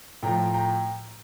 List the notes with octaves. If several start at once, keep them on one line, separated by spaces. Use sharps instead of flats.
A2 F3 G5 A#5
G5 A#5